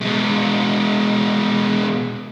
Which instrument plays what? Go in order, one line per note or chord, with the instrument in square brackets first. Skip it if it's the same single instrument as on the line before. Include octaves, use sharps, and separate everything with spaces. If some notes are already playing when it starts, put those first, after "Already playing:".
[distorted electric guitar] B2 G#3